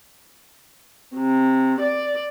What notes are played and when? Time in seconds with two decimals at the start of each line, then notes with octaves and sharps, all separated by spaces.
1.15 C3
1.80 D5